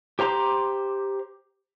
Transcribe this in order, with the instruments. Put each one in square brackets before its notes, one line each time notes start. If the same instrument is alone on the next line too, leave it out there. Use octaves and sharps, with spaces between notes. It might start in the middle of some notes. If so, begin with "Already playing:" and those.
[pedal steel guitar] G4 C5 A#5 C6 D6